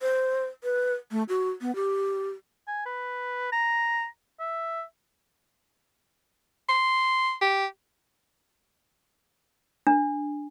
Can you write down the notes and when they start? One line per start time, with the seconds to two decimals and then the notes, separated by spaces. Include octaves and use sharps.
0.01 C5
0.64 B4
1.11 A3
1.29 F#4
1.61 B3
1.75 G4
2.68 G#5
2.86 B4
3.52 A#5
4.40 E5
6.69 C6
7.41 G4
9.87 D4